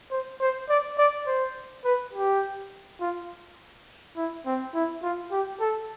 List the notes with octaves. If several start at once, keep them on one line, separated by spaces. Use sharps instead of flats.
C5
C5
D5
D5
C5
B4
G4
F4
E4
C4
E4
F4
G4
A4